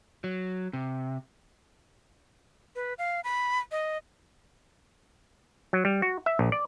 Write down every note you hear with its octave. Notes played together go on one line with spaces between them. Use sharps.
F#3
C3
B4
F5
B5
D#5
F#3
G3
F#4
E5
A#1
D5